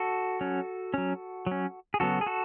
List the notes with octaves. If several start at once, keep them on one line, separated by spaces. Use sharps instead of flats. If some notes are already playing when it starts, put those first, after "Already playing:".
Already playing: F#4 A4
F#3 C#4
F#3 C#4
F#3 C#4
G#4
C#3 F#3 B3 F#4 A4
G#4
F#4 A4